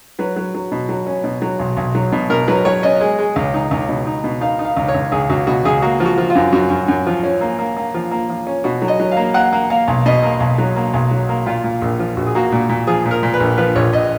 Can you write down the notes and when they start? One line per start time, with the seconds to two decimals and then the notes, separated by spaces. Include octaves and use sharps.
0.19 F#3 B4
0.36 F#3
0.54 F#3
0.72 B2
0.89 F#3
1.07 C#4
1.24 B2
1.42 F#3
1.59 B1
1.77 B1
1.95 F#3
2.12 B2
2.30 B2 A#4
2.48 F#3 B4
2.65 F#3 C#5
2.83 C#4 D#5
3.00 G#3
3.19 G#3
3.36 C#2
3.54 D#4
3.71 C#2
3.89 B2
4.07 D#4
4.24 B2
4.41 D#4 F5
4.59 D#4
4.65 F5
4.77 C#2
4.88 C#5
4.94 C#2
5.12 C#2 G#4
5.29 C#2 F#4
5.47 B2 F#4
5.65 C#2 G#4
5.82 A#3 F#4
6.00 F3
6.06 F#4
6.18 F3
6.30 F4
6.35 F#2
6.53 F#2 F#4
6.70 F#2
6.88 F#2
7.06 F3
7.24 C#4
7.41 A#3
7.59 A#3
7.77 A#3
7.94 F3
8.11 A#3
8.30 F3
8.47 C#4
8.64 B2 F#4
8.82 F#3
8.88 D#5
9.00 F#3
9.11 F5
9.17 A#3
9.34 A#3 F#5
9.53 A#3
9.70 A#3 F5
9.88 B1
10.06 B2 D#5
10.23 A#3
10.40 B1
10.58 F#3
10.76 A#3
10.94 B1
11.11 F#3
11.29 A#3
11.46 A#2 F4
11.64 A#2
11.82 A#1
11.99 F3
12.17 A#1 F#4
12.27 G#4
12.35 A#3 F#4
12.52 A#2
12.69 A#2
12.87 F3 G#4
13.05 A#2
13.11 A#4
13.23 A#2
13.34 B4
13.40 A#1
13.58 F3 B4
13.76 A#1 C#5
13.93 A#1 D#5